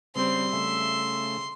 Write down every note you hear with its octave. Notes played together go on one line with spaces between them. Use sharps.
C#3 G3 C4 C6
C#3 A3 E5